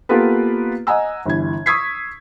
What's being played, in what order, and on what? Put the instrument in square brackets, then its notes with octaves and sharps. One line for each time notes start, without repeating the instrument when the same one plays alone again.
[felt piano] A#3 B3 F4 G4 A4 B4
D#5 F#5 G#5 A#5 E6
G1 E3 G#6
C#6 D#6 E6 G#6 B6 C7